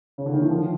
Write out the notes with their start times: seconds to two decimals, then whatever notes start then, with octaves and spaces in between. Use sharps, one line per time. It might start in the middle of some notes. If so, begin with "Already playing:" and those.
0.18 C#3
0.26 D3
0.34 D#3
0.41 E3
0.50 F3